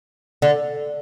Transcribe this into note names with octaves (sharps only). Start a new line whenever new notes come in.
D3